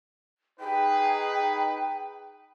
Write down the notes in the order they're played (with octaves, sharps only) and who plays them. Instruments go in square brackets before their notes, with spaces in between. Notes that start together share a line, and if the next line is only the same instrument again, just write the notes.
[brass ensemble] D#4 G#4 B4 [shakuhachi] G5